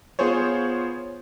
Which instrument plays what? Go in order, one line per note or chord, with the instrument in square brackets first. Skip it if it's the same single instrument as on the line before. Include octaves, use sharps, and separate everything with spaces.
[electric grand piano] B3 F4 G#4 C5 C#5